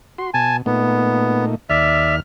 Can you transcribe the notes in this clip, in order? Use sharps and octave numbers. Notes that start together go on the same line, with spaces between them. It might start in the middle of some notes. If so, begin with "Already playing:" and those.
F#4 C6
B2 G#5 A5
A#2 A3 B3 D#4
D#2 D5 E5 F6